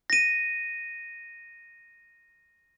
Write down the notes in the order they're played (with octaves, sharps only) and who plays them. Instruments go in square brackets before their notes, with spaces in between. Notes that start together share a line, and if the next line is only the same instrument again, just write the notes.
[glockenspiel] A#6 D#7